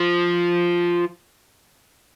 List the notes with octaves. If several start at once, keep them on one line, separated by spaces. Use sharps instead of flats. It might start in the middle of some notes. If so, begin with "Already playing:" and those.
Already playing: F3